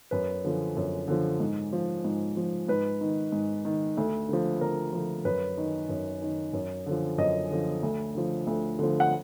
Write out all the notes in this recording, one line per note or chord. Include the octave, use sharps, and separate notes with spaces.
F#2 B4
D3 F3
F#2
D3 F3
G#2
F3
G#2
F3
G#2 B4
D#3
G#2
D#3
D2
D3 F3
D2 A#4
D3 F3
F#2 B4
D#3
F#2
D#3
F#2
D3 F3
F#2 D#5
D3 F3
D2
D3 F3
D2
D3 F3
F#5